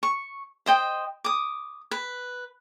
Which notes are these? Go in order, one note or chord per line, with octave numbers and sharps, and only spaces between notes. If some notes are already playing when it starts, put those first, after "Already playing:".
C#6
C5 D#5 G5
D6 D#6
B4